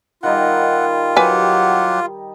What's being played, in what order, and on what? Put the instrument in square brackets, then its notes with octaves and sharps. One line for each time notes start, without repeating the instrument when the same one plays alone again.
[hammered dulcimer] D#3 G3 D#4 [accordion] F4 [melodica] F#5
[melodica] F#3 G4 F#5 [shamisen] B4 G#5